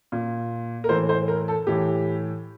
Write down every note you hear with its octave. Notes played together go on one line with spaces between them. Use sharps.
A#2
A#4
A2 E3 C5
C5
A#4
A4
A2 E3 G4